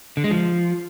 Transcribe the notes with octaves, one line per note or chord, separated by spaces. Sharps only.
D3
G#3
F3